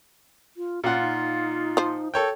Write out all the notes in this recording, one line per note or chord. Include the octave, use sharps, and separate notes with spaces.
F4
A#2 C#4 F4 F#5
D#4
F3 C5
A4 A#4 C#5 G5